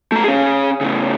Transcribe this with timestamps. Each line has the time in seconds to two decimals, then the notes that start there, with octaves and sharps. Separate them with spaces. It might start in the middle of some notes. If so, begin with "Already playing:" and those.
0.12 A3 A#5
0.24 C#4 G#4
0.81 A2 C#3